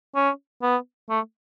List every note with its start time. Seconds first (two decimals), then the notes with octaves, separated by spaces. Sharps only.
0.15 C#4
0.62 B3
1.10 A3